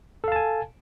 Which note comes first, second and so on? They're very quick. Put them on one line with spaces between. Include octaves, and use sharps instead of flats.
A4 F5 A5 G#5